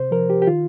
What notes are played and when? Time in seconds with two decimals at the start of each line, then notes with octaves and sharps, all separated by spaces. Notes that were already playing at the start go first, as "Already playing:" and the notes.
Already playing: C3 C5
0.11 F3 A#4
0.30 G4
0.42 G4
0.47 D#3 F4